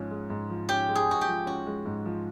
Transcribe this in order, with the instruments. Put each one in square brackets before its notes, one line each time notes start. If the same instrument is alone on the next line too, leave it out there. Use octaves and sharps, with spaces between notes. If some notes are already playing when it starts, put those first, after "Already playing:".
Already playing: [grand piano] G#2 F3 G#3 C#4
G#3
G#2
F3
[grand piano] C#4 [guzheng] G4
[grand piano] G#3
[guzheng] G#4
[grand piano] G#2 [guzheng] F#4
[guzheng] G4
[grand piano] F3
[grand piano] C#4 [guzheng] F#4
[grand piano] G#3
G#2
F3